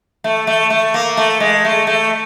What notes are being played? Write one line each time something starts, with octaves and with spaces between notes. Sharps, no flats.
A3
A3
A3
A#3
A3
G#3
A3
A3